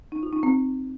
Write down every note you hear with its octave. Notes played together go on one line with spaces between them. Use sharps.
D#4
F4
D#4
C4